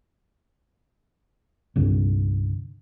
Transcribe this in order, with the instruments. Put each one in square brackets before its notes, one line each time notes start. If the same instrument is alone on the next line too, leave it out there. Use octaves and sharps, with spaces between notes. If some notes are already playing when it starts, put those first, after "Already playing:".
[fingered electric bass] C2 G2 D3